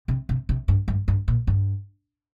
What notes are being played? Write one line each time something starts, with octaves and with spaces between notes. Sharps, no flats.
C3
C3
C3
G2
G2
G2
A#2
G2